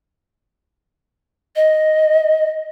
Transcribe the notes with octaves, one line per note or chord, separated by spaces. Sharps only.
D#5